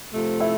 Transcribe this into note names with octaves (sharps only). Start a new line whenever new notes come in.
C3 F3 A3
E4